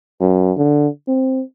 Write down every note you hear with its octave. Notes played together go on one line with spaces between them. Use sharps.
F#2
D3
C4